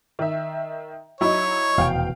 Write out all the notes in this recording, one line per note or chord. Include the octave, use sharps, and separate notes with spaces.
D#3 E5
F#3 D#4 E4 C#5
F1 E2 B2 F5 G5